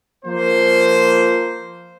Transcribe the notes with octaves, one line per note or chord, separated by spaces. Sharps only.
F3 A#3 C5